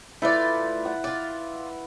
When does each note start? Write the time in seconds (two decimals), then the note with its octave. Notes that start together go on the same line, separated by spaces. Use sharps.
0.22 A3 E4 F4 B4 D5 E5
0.85 F#5
1.04 F4 D5